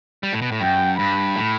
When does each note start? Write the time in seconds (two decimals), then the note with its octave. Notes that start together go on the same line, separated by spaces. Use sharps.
0.23 G3
0.33 A2
0.42 B2
0.52 A2
0.61 F#2 G5
0.98 G2 B5
1.36 A2